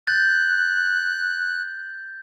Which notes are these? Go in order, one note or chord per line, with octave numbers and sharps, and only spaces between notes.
F#6 G6 A6